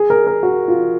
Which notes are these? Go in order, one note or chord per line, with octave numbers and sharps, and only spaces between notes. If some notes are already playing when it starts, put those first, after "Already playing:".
Already playing: G#4
A#4
A#4
F#4
F4